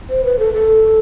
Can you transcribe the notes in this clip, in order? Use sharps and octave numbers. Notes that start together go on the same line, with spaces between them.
C5
B4
A4
A4